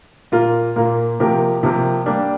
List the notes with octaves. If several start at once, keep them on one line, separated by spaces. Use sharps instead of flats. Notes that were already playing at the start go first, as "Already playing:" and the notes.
A#2 A#3 F4 A#4
A#2 A#3 F4 A#4
C3 F3 A#3 G4 A#4
C3 F3 A#3 G4 A#4
G3 A#3 D4 G4